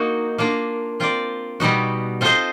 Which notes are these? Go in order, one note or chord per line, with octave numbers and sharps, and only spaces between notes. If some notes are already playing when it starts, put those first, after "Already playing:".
Already playing: A#3 D#4 F#4
A#3 D4 F4 A#4
C4 F4 A#4 D5
B2 G3 B3 D#4 F#4
C4 F4 A4 C5 D#5